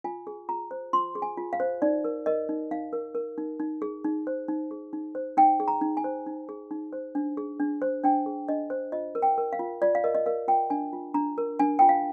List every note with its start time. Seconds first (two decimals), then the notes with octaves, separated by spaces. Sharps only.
0.04 F4 G#5
0.27 G#4
0.49 F4 A#5
0.71 C5
0.93 F4 C6
1.15 G#4
1.22 G#5
1.37 F4
1.53 F5
1.60 C5
1.82 D#4 D5
2.04 A#4
2.26 A#4 D#5
2.49 D#4
2.71 D#4 F5
2.93 A#4
3.15 A#4
3.38 D#4
3.60 D#4
3.82 G#4
4.04 D#4
4.27 C5
4.48 D#4
4.71 G#4
4.93 D#4
5.15 C5
5.37 D#4 G5
5.60 G#4
5.68 A#5
5.81 D#4
5.97 G#5
6.04 C5
6.27 D#4
6.49 G#4
6.71 D#4
6.93 C5
7.15 D4
7.37 G#4
7.60 D4
7.82 C5
8.04 D4 G5
8.26 G#4
8.48 D4 D#5
8.70 C5
8.92 F4 D#5
9.15 A#4
9.22 G5
9.38 A#4
9.53 F5
9.59 F4
9.82 F4 D5
9.95 F5
10.04 A#4 D#5
10.15 D#5
10.26 A#4 F5
10.48 F4 G5
10.70 D4 G#5
10.93 F4
11.14 D4 A#5
11.38 A#4
11.59 D4 G#5
11.79 F4 G5
11.89 F5